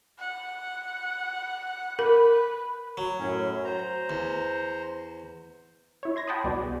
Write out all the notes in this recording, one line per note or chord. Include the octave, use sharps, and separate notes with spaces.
F#5
A#4 B4
F#3
F#2 A2 C#4
C5 A#5
E2
E4 C#5
C6 G#6 A#6
F#5 G5 A5 B5 C6 D#6
C2 B2 D5
G#4